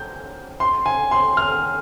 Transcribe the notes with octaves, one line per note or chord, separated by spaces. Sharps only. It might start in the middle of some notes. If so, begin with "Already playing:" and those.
Already playing: G6
C6
G#5
C6
F6